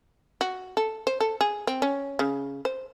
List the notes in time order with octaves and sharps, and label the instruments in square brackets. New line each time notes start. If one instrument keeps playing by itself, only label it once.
[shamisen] F#4
A4
C5
A4
G#4
C4
C#4
C#3
C5